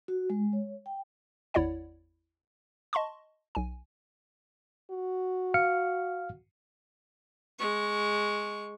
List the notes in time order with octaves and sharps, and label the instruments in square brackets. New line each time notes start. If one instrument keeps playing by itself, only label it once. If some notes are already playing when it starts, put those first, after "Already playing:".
[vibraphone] F#4
G#3
C#5
G5
[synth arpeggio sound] G#1 E2 E4 C#5 D5 F#5
D#5 A5 C6 C#6
B1 G#5
[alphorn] F#4
[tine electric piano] F5 F6 C#7
[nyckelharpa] G#3 C#6